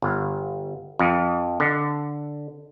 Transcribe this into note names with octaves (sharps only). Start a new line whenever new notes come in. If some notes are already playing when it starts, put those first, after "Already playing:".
G1
F2
D3